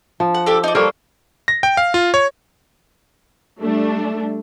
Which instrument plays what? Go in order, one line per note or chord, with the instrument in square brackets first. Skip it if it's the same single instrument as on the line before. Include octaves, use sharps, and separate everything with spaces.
[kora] F3
[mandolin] F#5
D4 G4 A4
D#4 D5
[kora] G3 A#3 C5 [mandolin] A4 A#4 C#5
[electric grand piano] A#6
G5
F5
F4
C#5
[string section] G3 A3 D4